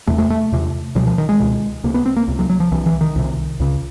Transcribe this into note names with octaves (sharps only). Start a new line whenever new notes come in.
E2 C3 A3
A3
A3
E2 C3
C#2 B2 F#3
F3
D#3
G#3
C#2 B2
C#2 C3 A#3
B3
C4
A#3
C#2 C3
F#3
F#3
F3
C2 C3 E3
E3
D#3
C2 C3
C#2 C#3